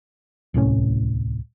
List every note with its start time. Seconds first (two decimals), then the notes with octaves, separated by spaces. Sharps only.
0.54 D1 C2 A2 C#4